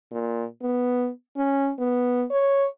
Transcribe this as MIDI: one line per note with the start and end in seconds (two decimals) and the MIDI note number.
0.12 0.44 46
0.62 1.10 59
1.37 1.71 61
1.79 2.24 59
2.30 2.67 73